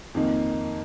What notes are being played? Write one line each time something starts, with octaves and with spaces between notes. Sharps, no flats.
F2 D#3 A#3 D#4